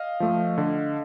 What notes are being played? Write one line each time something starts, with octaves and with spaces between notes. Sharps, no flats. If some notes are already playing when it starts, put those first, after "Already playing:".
Already playing: D#5 F5
F3 A3
D3